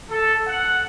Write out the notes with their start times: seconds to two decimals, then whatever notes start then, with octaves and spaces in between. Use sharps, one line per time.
0.11 A4
0.48 F#5